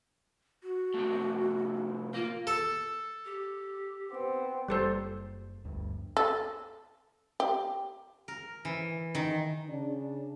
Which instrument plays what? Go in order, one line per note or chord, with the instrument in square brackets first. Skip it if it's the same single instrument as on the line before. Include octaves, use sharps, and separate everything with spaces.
[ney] F#4
[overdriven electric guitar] A2 C3
[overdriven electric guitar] A#3 [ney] F4
[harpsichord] A4
[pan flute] G4
[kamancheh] B3 C4
[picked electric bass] F#1 [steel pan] G3 A4 C5
[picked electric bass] G1 D2 G2
[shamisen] A4
G4
[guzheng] A#4
E3
D#3
[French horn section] C#3 D4